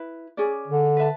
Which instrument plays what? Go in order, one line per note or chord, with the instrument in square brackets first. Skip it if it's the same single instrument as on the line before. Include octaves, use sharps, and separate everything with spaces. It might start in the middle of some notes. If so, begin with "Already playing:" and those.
Already playing: [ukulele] E4 B4
C#4 G#4 D5
[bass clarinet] D3
[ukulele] B4 E5 A5